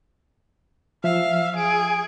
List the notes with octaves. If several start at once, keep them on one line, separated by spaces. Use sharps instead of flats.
F3 E5 F5
G#4 D7